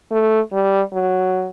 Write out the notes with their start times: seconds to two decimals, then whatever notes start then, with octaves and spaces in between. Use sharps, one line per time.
0.11 A3
0.52 G3
0.93 F#3